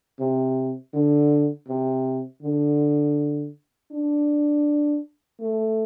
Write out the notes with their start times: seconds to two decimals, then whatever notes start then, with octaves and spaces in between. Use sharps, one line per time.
0.20 C3
0.94 D3
1.68 C3
2.42 D3
3.92 D4
5.40 A3